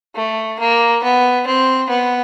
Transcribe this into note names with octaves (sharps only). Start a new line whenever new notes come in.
A3
A#3
B3
C4
B3